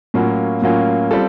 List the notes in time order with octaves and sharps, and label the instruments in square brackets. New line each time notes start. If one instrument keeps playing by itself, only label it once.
[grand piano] A2 F#3 A#3 C#4 F4
A2 F#3 A#3 C#4 F4
G3 C4 F4 A4